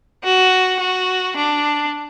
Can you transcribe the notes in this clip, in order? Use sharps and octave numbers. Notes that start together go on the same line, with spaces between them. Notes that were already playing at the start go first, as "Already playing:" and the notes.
F#4
F#4
D4